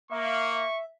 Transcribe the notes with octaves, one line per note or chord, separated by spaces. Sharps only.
A#3 E5 C#6